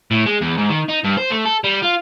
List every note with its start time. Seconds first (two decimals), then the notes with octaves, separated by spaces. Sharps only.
0.11 A2
0.26 G#3
0.41 E2
0.58 G#2
0.70 D#3
0.89 D#4
1.04 G2
1.18 C5
1.31 A3
1.45 A4
1.64 G3
1.82 F4